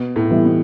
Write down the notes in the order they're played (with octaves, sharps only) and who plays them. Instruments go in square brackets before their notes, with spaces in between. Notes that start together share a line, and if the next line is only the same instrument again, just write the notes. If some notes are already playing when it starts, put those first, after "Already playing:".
Already playing: [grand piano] B2
A2
[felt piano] E3 G3 B3 E4
[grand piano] B2